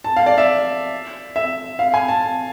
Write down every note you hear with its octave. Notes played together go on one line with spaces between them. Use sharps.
A5
F5
D5
E5
E5
F5
G#5
A5